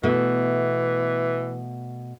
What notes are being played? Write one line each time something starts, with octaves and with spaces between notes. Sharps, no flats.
B2 E3 A3